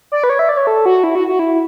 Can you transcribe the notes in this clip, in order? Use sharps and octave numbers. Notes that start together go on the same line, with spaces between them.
D5
B4
C#5
E5
D5
C#5
A4
F#4
E4
F#4
F#4
E4